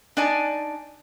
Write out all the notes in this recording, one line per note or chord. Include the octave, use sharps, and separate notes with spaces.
D4 D#4 D5 G#5 A5